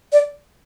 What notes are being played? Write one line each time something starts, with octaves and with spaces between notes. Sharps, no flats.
D5